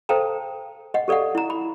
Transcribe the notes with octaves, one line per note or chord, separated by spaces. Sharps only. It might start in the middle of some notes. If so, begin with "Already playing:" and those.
A4 C5 F5 G5 A5 A#5
D#5 F#5
G4 A4 D5 F5 F#5
E4 A#5
B5